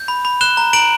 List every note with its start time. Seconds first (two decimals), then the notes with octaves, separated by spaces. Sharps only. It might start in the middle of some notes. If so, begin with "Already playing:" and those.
Already playing: G6
0.08 B5
0.25 B5
0.41 F#6 E7 G7
0.57 A#5
0.73 A#5 D7 F#7